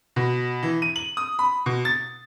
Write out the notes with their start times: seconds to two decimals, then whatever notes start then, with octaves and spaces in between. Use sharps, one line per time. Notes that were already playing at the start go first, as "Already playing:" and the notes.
0.16 B2
0.63 E3
0.82 D#7
0.96 F#7
1.17 D#6
1.39 B5
1.66 B2
1.85 A6